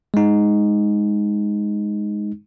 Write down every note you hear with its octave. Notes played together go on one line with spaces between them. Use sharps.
G#3 D#4